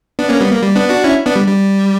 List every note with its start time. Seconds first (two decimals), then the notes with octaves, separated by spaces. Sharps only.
0.19 B3 D4
0.29 A#3 C#4
0.40 G3 B3
0.51 A#3
0.62 G3
0.76 B3 D4
0.89 D4 F#4
1.04 C#4 E4
1.25 B3 D4
1.36 G3
1.47 G3